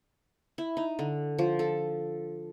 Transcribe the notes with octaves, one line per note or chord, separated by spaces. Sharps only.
E4
D#4
D3
F3
A4